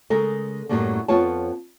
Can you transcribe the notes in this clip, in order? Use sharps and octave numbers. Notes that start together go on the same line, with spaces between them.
C#3 G#3 A4 A#4
F#2 A2 F#3 G3 A3 A#3
F2 B3 F4 C#5 A5